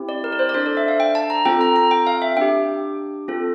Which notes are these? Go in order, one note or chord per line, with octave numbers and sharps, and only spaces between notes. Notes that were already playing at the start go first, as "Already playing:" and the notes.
Already playing: C4 E4 G4
D5
A#4
D5
C5
D5
D4 A4 C5
D5
E5
F5
G5
A5
A#5
C4 F4 A4 G5
A#5
A#5
G5
F5
E5
D4 G4 G5
C4 F4 A4